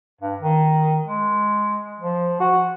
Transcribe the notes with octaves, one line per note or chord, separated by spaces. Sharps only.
G2
D#3
G#3
F3
F#4